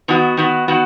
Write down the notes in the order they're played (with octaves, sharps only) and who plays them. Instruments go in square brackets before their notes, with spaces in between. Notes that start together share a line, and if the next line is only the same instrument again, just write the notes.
[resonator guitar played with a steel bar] D#3 B3 F#4
D#3 B3 F#4
D#3 B3 F#4